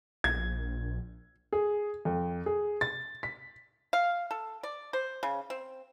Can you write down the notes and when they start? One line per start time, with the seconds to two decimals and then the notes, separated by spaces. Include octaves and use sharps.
0.24 A#1 G#6
1.53 G#4
2.05 F2
2.46 G#4
2.81 A6
3.23 B6
3.93 F5
4.31 A4
4.63 D5
4.93 C5
5.23 C#3
5.50 C4